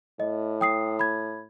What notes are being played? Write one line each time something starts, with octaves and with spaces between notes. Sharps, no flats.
A2 D#5
G5 D#6 C7
B5 G#6